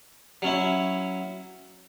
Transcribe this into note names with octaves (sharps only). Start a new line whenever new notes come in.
F#3 C#4 E4